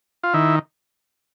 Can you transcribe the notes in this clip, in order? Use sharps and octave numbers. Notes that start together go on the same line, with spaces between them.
F4
D#3 E4